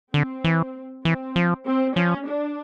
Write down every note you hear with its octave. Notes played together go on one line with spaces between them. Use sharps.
D3 C4
E3
E3 C4
F3
C4
F3 C#4
D4